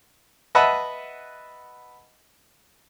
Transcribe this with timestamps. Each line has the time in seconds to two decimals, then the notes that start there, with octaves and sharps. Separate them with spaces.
0.55 B4 D#5 E5 F#5 A5 B5